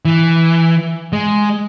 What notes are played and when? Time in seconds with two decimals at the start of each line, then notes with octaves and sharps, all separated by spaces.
0.05 E3
1.13 G#3